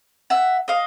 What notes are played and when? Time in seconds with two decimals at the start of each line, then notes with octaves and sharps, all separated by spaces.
0.30 E5 F#5
0.68 D#5 F5